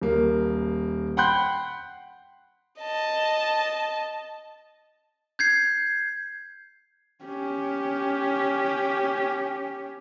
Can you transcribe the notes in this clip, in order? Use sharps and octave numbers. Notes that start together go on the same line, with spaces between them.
D#1 A#3
F#5 G5 B5 C6 F#6 G6
D#5 A5
G6 G#6 C7
C#4 G4